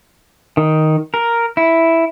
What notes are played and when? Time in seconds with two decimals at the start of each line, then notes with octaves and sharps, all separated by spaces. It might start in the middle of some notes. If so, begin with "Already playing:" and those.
0.57 D#3
1.14 A#4
1.57 E4